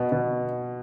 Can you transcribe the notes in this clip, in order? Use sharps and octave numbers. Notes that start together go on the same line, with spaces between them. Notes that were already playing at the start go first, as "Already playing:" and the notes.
Already playing: B2
B2